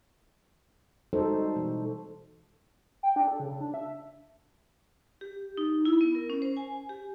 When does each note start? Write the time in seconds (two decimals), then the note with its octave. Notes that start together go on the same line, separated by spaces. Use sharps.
1.13 G3 G#3 D#4 F#4 A4 C5
1.38 C4
1.56 B2 E3
3.03 G5
3.16 D4
3.27 A4
3.40 C#3
3.60 D4
3.74 E5
5.21 G4
5.57 D#4
5.85 E4
6.01 B3
6.15 A#4
6.30 C#4
6.42 C5
6.57 G#5
6.89 G4